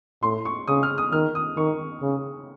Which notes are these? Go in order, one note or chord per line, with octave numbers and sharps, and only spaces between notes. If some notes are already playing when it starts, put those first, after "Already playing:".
A2 C6
C#6
C#3 D#6
F6
D#6
D#3 F6
D#6
D#3 C#6
C#3